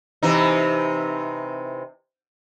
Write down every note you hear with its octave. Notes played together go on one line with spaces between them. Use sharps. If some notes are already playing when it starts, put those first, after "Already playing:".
C3 E3 D#4